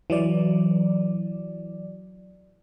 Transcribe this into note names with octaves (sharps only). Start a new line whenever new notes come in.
E3 F#3 D5